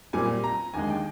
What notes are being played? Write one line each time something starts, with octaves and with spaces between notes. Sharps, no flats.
A#2 G3 C4 G#5
A#5
D#2 D3 G#3 G#5
G5